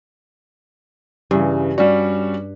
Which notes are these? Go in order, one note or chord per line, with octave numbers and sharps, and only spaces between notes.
G2 C#3 E3
G3 C#4 F#4 D5